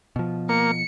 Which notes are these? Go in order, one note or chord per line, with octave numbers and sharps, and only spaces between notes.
B2 F3
A#3 C#7